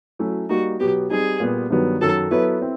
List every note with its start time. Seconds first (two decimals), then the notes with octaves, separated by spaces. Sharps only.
0.19 F#3 A3 C#4 E4
0.49 G3 A#3 D#4 F#4
0.80 B2 F#3 B3 G4
1.10 G3 C4 D#4 G#4
1.40 A#2 G3 B3
1.70 G2 D#3 F#3 B3
2.01 F#2 D#3 F#3 A4
2.31 F#3 B3 E4 A4 B4 C#5
2.61 C4 E4